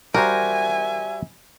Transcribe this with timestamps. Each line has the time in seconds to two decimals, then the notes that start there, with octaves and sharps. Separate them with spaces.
0.14 G3 F#4 A#4 C5 E5 G#5